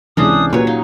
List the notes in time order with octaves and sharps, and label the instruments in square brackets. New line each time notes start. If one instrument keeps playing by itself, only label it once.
[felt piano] C#2 C3 E3 [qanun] C#4 D4 C5 [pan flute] D#6
[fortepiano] A#2 [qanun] F#3 C#5 [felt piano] G4 [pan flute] B4
[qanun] D#4 [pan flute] F5